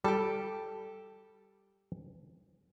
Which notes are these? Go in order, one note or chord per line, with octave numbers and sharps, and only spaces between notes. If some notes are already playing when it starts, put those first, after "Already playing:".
G3 G4 A4